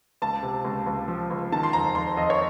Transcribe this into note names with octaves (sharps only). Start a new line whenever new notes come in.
C#2 A5
C3
C#2
C#2
F3
C#2
D#3 A5
C6
F2 A#5
F2 C6
F2 D#5
C#5